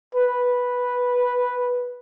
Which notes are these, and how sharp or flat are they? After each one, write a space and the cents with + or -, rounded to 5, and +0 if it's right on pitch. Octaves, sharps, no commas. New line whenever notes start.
B4 -5